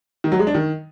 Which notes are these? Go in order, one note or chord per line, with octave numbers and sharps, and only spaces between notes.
D#3
F#3
G#3
D4
D#3